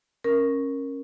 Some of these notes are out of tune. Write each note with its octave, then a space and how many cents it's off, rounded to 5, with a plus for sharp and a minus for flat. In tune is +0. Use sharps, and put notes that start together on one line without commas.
C#4 -20 A#4 +0